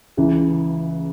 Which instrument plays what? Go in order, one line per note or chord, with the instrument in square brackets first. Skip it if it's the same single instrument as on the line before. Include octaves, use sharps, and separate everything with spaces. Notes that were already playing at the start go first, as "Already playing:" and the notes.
[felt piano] C#2 C#3 E3